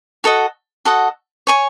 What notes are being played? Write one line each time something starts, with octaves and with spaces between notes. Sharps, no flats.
F#4 A4 D#5 F#5
F#4 A4 D#5 F#5
C#5 G#5 C#6